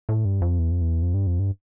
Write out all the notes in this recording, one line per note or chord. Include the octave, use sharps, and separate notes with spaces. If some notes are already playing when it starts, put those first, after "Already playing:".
A2
G2
F2
E2
F2
E2
F2
G2
F2
G2